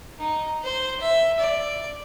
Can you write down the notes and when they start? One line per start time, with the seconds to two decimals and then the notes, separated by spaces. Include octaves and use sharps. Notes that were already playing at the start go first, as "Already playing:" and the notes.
0.19 D#4
0.63 C5
1.01 E5
1.39 D5